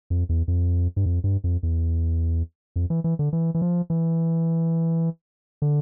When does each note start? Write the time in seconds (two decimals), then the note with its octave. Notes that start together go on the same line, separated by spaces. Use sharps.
0.10 F2
0.29 E2
0.48 F2
0.96 G2
1.06 F2
1.24 G2
1.44 F2
1.63 E2
2.76 F2
2.90 E3
3.04 E3
3.19 D3
3.33 E3
3.54 E3
3.62 F3
3.90 E3
5.62 D3